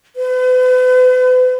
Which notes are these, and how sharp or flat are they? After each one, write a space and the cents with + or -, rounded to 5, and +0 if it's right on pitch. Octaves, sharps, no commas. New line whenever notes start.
B4 +40